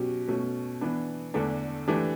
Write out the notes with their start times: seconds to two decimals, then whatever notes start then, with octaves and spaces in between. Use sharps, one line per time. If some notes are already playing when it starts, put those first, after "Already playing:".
Already playing: B2 F#3 C#4 G4
0.28 B2 A3 C#4
0.81 E3 B3 D4
1.34 E2 D3 A3 D4 A4
1.88 E3 A3 D4 G4